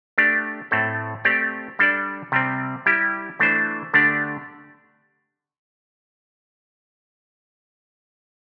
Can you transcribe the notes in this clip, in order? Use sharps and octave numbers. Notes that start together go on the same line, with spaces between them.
A3 D4 G4 D5
A2 A3 C4 A4
A3 C4 G4 D5
G3 D4 A4 D5
C3 G3 C4
G3 E4 G4
E3 A3 D4 C5
D3 A3 D4 G4 D5